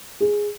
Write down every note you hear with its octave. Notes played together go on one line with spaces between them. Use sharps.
G#4